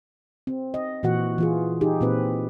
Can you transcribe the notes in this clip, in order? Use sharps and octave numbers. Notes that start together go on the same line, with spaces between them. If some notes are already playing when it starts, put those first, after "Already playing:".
C4
D#5
A#2 E3 F#4 F#5
E3 F4 G#4
D#4 G4 G#4
A#2 C4 B4